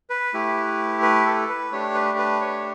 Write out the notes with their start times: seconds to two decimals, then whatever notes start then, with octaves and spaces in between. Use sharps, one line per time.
0.10 B4
0.34 A3 E4 G4
1.02 B4
1.26 A4
1.49 B4
1.71 A3 D4 G4 C#5
1.94 B4
2.18 B4
2.41 C#5